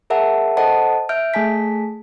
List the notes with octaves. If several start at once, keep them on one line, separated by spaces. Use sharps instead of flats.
G#4 A#4 E5 F#5 A5
A4 C5 D#5 F#5 A5
E5 F6 G6 D7
A3 G#4 G#5 A5 B6